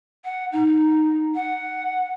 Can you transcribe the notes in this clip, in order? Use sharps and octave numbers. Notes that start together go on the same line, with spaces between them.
F#5
D#4
F#5